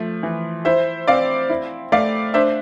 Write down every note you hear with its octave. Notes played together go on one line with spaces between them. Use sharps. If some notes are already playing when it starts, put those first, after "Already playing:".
Already playing: F3 A3
E3
E4 C5 E5
C4 D5 F5
E4
A3 D5 F5
D4 C5 E5